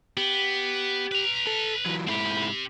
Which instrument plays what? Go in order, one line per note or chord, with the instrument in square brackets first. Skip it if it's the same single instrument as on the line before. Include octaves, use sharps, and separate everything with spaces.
[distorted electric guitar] B3 [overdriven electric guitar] G4
[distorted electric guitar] B4 A#5
[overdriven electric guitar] A4
E3 F#3
[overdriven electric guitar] G#2 E4 [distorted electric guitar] C4 G4